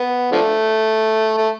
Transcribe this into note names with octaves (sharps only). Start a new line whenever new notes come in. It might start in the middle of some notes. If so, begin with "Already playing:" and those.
Already playing: B3
D3 F3 A3
A3